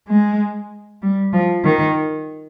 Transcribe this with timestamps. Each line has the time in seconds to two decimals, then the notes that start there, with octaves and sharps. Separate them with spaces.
0.08 G#3
1.02 G3
1.33 F3
1.64 D#3